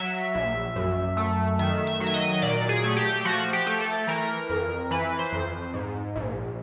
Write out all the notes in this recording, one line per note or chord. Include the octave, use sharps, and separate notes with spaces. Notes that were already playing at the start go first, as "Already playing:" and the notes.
Already playing: F#3 E5
A#1
F#2
A3
D#3 E5
E5
F#3
E5
D#5
A#2 D5
G#4
A3
G4
F3 F#4
G4
A3
A4
E3 A#4
F2
E3 B4
C5
F2
G#2
A#1